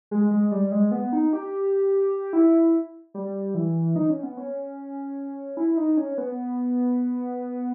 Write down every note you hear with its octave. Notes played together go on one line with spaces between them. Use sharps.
G#3
G#3
G3
G#3
B3
D#4
G4
E4
G3
E3
D#4
C#4
B3
C#4
E4
D#4
C#4
B3